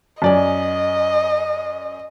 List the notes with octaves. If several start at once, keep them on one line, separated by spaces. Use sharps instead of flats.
F#2 D5 D#5 G#5